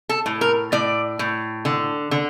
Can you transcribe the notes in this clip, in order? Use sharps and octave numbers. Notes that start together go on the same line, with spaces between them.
A4
A2
A#4
A2 D5
A2
D3
D3